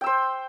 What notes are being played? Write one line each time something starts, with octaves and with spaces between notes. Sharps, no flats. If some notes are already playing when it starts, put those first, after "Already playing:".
C5 G5 E6